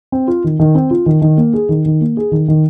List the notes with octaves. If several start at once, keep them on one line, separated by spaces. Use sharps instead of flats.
C4
F4
D#3
D#3
C4
F4
D#3
D#3
A#3
G#4
D#3
D#3
A#3
G#4
D#3
D#3